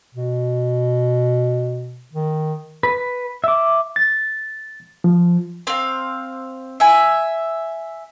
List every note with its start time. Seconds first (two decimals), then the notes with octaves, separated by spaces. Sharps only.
0.15 B2
2.13 D#3
2.83 B4
3.44 E5 D6
3.96 A6
5.04 F3
5.67 C4 F5
6.80 E5 G#5